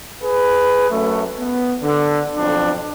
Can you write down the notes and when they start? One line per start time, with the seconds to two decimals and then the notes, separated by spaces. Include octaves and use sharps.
0.23 G#4 B4
0.91 F#2 A3
1.38 B3
1.82 D3
2.36 B1 F2 D4